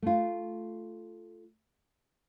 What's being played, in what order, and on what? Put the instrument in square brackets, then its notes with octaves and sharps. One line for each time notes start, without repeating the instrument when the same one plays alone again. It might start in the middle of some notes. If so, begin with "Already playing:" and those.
[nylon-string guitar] A3 F4